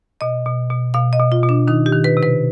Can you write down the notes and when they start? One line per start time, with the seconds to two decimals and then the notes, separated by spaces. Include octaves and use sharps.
0.21 B2 D#5
0.46 B2
0.70 B2
0.94 B2 F5
1.13 D#5
1.19 B2
1.32 F4
1.43 B2
1.49 D4
1.67 D#3 D#4
1.86 G4
1.92 D#3
2.04 B4
2.17 C3
2.23 B4